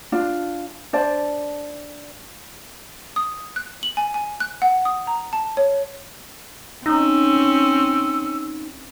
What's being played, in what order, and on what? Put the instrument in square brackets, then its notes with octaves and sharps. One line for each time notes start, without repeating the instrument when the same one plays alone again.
[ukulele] D4 F4
D4 C5 D5 A5
[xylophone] D#6
F#6
F#7
G#5
G#5
F#6
F#5
D#6
A#5
A5
C#5
[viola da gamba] C4 C#4 [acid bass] D#4 [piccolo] E6